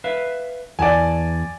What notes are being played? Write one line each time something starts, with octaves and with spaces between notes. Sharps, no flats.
B4 E5 F5
E2 D5 G#5 A5